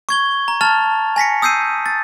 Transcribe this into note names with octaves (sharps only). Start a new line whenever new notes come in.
C#6 G#6 G7
A#5
A5 F6 A6 F7
G#5 A#6 B6 C#7
D#6 E6 G6 C7 D#7
A6